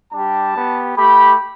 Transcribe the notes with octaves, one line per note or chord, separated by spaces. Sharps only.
G3 D4 G4 A5
B3 G4
A3 G4 B5